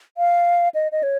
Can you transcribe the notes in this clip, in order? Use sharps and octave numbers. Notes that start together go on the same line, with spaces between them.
F5
D#5
D#5
C#5